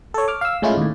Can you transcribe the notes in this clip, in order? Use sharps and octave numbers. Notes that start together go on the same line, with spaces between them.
A4 C#5
D6 F6
F5 E6
A2 G#3 C#4 E4 F4
D#2 A2